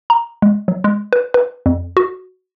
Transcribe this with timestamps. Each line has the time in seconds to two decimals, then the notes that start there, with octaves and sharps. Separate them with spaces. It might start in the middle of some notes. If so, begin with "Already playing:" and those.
0.10 A#5
0.42 G#3
0.68 F#3
0.84 G#3
1.13 B4
1.34 B4
1.66 F2
1.97 F#4